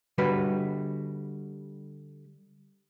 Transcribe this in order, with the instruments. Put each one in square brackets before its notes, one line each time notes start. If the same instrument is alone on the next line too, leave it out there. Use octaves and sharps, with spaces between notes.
[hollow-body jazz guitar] D3 G3 F#4 B4